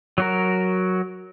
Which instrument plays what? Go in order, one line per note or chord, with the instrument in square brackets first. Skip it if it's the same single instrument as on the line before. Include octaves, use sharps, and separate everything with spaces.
[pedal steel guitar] F#3 F#4 A#4